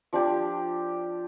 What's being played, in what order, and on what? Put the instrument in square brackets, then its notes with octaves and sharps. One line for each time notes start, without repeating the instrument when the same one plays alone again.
[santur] F3 D4 G4